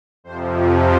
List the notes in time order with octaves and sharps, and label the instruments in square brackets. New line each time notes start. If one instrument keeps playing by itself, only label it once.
[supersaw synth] F2 C3 F3 C5